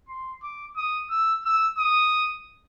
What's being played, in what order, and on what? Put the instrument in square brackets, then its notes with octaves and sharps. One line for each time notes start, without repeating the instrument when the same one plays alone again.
[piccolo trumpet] C6
D6
D#6
E6
E6
D#6